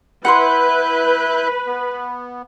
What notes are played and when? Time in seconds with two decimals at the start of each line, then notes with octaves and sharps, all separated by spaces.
0.25 E4 B4 F#5 B5 C6 F#6 G6
1.67 B3